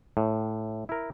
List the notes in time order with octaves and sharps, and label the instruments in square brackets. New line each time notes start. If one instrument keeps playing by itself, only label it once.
[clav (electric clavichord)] A2
E4 A#4